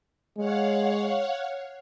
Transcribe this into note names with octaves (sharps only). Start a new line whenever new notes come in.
G#3 C#5 F5 F#5